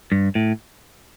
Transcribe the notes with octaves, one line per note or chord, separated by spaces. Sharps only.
G2
A2